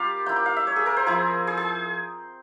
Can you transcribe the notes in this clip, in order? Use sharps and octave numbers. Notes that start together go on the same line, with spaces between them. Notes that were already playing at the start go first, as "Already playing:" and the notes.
Already playing: G3 C#4 F4 G4 A#4 F5
A#3 E4 G5
G5
F5
E5
C#5
G#4
A#4
C5
F3 C4 E4 G#4
G#4
G#4